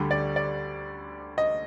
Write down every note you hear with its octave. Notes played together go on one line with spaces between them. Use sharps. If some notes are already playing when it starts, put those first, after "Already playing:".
Already playing: D2 D3 G3
D5
D5
D#5